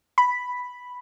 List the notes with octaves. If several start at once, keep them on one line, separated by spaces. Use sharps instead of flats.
B5